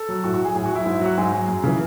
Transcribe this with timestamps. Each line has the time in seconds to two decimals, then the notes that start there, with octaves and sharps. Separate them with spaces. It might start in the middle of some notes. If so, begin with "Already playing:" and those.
Already playing: A4
0.09 F#3
0.24 A2 F#4
0.34 F#4
0.40 F#3 G#4
0.55 A2 G#4
0.66 F#4
0.71 F#3 E4
0.86 G#2
1.01 F#3 F#4
1.18 G#2 G#4
1.32 F#3
1.48 F#2
1.64 C#3 E3